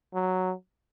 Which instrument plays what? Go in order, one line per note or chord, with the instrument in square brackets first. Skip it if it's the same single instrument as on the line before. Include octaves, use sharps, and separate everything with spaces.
[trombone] F#3